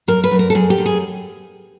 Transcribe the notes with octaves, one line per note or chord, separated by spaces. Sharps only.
F#2 A#4
B4
F#2
A#4
A4
F#2 G#4
G4
F#2
G#4